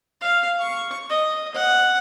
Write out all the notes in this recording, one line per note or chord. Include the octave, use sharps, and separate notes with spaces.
F5
C#6
D#5
F#5